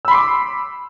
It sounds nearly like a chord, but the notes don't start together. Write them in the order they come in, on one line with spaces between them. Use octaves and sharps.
E6 B5 C6 D6